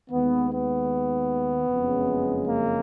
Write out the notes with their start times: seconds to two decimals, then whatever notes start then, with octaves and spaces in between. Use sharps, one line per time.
0.10 D#2 D#3 G#3 B3
0.50 B3
1.68 F#1 F2 C#3 G#3
2.47 A#3